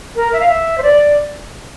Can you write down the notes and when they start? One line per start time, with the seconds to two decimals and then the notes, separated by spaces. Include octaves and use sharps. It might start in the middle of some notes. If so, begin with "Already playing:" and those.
0.16 A#4
0.33 E5
0.40 F5
0.48 E5
0.78 C5
0.83 D5